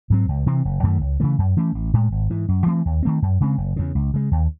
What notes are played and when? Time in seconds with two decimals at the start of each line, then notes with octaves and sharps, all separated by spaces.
0.10 G#2 F#3 C4
0.29 C#2
0.46 C3 E3 C4
0.65 F#1
0.83 F#2 D#3 A3
1.01 C#2
1.20 C#3 E3 A3
1.38 F#2
1.57 E3 A3 C#4
1.75 A1
1.93 A2 G#3
2.12 G#1
2.30 G#2 E3
2.48 F#2
2.66 E3 A3 C4
2.85 D#2
3.03 D#3 A3 C4
3.22 F#2
3.40 C#3 G#3 C4
3.58 F#1
3.76 E2 C#3
3.95 C#2
4.14 C#3 G#3
4.31 D#2